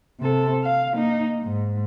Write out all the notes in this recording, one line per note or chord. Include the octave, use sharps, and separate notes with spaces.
C3 A4
F5
A#3 D#4
G#2